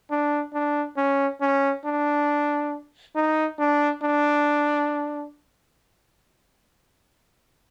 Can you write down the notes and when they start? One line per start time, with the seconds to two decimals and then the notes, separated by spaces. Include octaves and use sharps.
0.10 D4
0.53 D4
0.97 C#4
1.41 C#4
1.85 D4
3.15 D#4
3.59 D4
4.02 D4